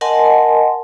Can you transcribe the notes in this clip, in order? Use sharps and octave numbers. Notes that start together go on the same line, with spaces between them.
A#4 D#5 F#5 G#5 A5 C6